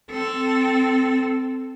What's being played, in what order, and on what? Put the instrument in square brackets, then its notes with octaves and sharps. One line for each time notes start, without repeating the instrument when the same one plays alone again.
[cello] C4 A4